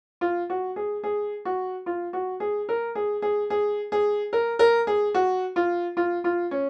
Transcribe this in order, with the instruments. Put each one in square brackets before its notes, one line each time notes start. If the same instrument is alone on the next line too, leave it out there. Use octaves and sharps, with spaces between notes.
[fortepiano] F4
F#4
G#4
G#4
F#4
F4
F#4
G#4
A#4
G#4
G#4
G#4
G#4
A#4
A#4
G#4
F#4
F4
F4
F4
C#4